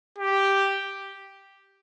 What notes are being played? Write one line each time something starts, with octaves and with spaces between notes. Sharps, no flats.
G4